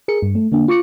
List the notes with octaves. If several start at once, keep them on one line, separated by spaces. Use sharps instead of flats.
G#4 A#4 C#7
G2
A3
D3 A#3 D4
F4 C#6 D6 C#7